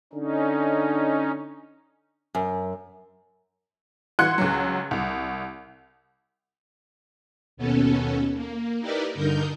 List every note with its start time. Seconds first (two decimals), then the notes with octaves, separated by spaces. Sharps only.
0.13 D3 C#4 D#4
2.35 F#2
4.19 E3 F#4 C6 F#6 G#6 C#7
4.38 C#2 F#3
4.91 C2
7.57 D#2 B2 B3 C#4 A4
8.34 A#3
8.80 D#4 E4 G4 A#4 B4 D5
9.14 G2 D3 D#4 A#4 G6